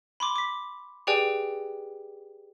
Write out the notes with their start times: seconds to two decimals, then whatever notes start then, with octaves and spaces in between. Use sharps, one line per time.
0.20 B5 C6 D6
0.36 D6 B6
1.07 G4 G#4 B4 D5 G5 G#5